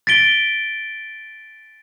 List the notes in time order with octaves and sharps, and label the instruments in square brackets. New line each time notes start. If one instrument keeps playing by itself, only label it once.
[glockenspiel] A6 B6 D7 G7